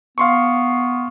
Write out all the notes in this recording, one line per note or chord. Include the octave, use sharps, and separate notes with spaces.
B3 F5 C6 C#6